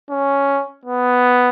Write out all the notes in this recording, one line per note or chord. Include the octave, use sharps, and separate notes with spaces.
C#4
B3